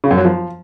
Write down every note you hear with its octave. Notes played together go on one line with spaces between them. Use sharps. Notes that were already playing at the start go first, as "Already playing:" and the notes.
C#3
F#2
F#3
F3